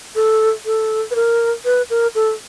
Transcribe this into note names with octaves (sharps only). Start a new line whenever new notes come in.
A4
A4
B4
A#4
B4
A#4
A4